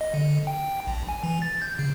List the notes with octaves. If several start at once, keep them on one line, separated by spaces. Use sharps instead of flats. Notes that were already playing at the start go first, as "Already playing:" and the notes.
D#5
D3
G5
A#1
G#5
E3
A6
G6
C#3